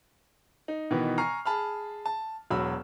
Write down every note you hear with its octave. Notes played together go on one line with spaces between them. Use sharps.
D#4
B2 D#3 E3 B3
G#5 A#5 C#6 F6 C7
G#4 A5 B5 F6
A5
E1 F#3 B5 E6 F6